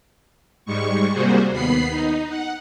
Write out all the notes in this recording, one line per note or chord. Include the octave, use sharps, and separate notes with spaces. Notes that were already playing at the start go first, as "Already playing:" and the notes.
G#2 G3 G#3 C#6
C3 G3 A#3 F#4 G#4 C5
D#2 B3 B5 C7
D#4
F#5